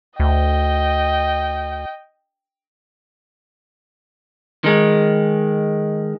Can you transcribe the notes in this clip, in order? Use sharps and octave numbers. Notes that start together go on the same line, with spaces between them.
D2 D#5 G5
D#3 G#3